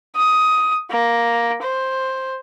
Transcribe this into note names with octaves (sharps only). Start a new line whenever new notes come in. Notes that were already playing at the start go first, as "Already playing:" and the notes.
D#6
A#3
C5